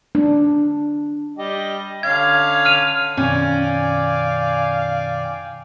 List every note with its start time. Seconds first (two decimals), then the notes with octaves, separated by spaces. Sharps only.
0.15 D4
1.37 G3 G4 D#5
2.03 D3 C#4 F5 G#6
2.65 F6 D#7 F7
3.17 F#2 B2 D#3 C#4 D5 F5 G5 G#5